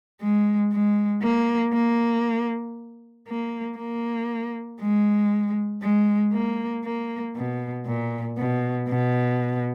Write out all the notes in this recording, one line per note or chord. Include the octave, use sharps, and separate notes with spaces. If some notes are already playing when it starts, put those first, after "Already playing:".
G#3
G#3
A#3
A#3
A#3
A#3
G#3
G#3
A#3
A#3
B2
A#2
B2
B2